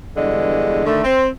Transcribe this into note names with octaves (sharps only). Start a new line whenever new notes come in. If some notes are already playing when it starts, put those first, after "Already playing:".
E2 G2 D3 G#3
D3 D#3 A3
C4